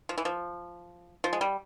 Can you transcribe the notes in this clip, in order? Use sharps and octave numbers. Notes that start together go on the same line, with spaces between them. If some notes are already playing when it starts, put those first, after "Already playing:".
F3
E3
F3
F3
G#3
G3